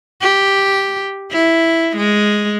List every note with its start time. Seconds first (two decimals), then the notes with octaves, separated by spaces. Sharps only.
0.21 G4
1.32 E4
1.97 G#3